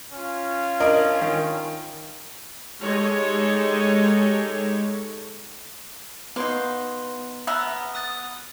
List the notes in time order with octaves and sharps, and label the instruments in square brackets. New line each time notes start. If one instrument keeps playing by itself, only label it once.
[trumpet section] C#4 F4
[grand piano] D4 A#4 D#5
D#3
[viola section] G#3 D#4 G4 A4 C#5
[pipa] A#3 D#4 [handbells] B3 B4 C6
[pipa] B3 E5 A#5 [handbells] F6
[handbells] D#6 F#6 A6